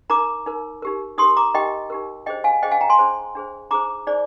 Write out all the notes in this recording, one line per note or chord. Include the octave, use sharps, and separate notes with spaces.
D#4 A#4 A#5 D6
D#4 A#4
D#4 G4 A#4
D#4 G4 A#4 C6 D#6
A#5 D6
D#4 G4 A#4 D#5 G5
D#4 G4 A#4
D4 G#4 C5 D#5 G5
F5 G#5
D4 G#4 C5 D#5 G5
F5 G#5
G5 A#5
G#5 C6
D4 G#4 C5
D4 G#4 C5
D#4 G#4 C5 A#5 D6
D#4 G#4 C5 D5